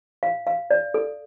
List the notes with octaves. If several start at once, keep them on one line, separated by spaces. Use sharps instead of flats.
F5
F5
D5
A4